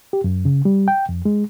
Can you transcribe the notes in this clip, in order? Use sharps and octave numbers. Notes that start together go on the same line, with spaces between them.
G4
F#2
C#3
G3
G5
F2
G#3